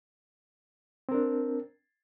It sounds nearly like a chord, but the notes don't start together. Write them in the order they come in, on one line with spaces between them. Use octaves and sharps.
C4 A#4 D4